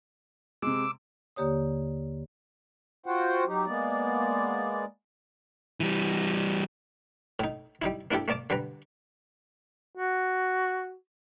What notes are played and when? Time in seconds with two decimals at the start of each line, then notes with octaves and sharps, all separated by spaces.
0.62 C3 G#3 D6 E6
1.36 D#2 D3 A#3 G4 C#5 D#6
3.06 F4 F#4 C5 F#5 G5
3.47 F#3 D#4 G4
3.66 G#3 A#3 B3 D5
5.80 E3 G3
7.39 A2 D#4
7.82 G3 D#4 E4
8.11 A#3 D4 E4 G4 A4
8.28 A3 A#3 D5 A5 D6
8.50 D3 G3 B4 A#5
9.97 F#4